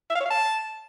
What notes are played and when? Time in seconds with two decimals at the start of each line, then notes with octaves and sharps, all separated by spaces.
0.10 E5
0.15 F5
0.21 C#5
0.26 F5
0.31 A5